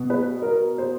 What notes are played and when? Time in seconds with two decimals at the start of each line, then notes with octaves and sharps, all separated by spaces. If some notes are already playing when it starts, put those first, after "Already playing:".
Already playing: B2 B3
0.10 B4
0.42 A#4
0.78 C5